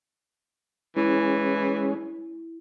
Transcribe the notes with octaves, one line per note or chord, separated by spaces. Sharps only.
E3 G#3 C#4 E4